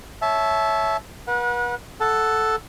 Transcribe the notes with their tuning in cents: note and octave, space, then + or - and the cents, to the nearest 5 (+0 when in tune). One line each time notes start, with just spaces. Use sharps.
C#5 +5 E5 +0 A5 -25
B4 -40 F#5 -30
A4 +0 F#5 +0 A5 +0